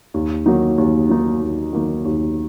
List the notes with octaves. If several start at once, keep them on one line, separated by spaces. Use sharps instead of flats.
D#2
D#3 F#3 A#3 D#4
D#2
D#3 F#3 A#3 D#4
D#2
D#3 F#3 A#3 D#4
D#2